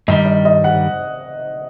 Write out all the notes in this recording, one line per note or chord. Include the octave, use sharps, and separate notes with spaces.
G2 D#3 G3 D#5
D#5
D#5
F#5